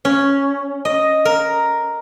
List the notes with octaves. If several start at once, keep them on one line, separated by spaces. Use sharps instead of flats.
C#4
D#5
A#4